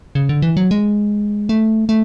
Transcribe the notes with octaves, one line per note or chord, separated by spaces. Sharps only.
C#3
D3
E3
F#3
G#3
A3
A3